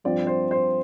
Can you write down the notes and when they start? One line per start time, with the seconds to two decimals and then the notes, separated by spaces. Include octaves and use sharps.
0.04 G2 F3 C4 D5
0.27 C5
0.51 C5